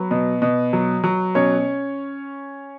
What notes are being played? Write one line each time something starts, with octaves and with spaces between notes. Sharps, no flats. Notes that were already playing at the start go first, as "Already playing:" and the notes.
Already playing: F#3 B3 B4
B2
B2
F#3
F#3
B2 C#4 C#5